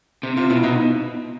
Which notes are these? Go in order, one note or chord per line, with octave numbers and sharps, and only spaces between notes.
C3
C3 F4
B2 E4
B2 D#4